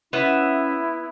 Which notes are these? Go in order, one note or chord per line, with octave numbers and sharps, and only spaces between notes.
B3 C#4 E4 E5